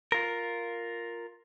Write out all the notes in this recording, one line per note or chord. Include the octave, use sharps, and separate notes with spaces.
F4 A#4